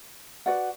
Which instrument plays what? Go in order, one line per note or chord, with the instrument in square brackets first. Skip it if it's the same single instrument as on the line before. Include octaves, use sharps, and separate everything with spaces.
[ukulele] F#4 B4 D5 F#5